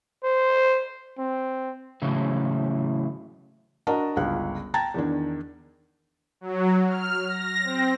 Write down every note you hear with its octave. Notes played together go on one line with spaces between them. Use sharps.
C5
C4
A2 C#3 E3 F#3
D4 F#4 A#4 D#5 F#5 A5
G1 C#2 F#6
G5 A5 A#5 G#6 A6
E2 D#3 D4
F#3
F6
A#6
C4